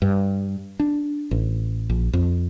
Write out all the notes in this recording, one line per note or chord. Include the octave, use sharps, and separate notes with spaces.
G2
D4
A1
A#1
F2